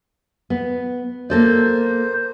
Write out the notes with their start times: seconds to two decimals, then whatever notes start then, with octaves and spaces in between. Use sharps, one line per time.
0.50 B3
1.30 A#3 A4 C5 D5